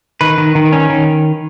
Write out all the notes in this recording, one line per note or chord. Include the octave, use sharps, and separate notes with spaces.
D#3 B4
D#3
D#3
C#4
D#3